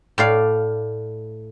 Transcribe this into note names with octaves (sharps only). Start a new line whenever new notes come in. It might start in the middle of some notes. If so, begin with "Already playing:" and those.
A2 D5 F5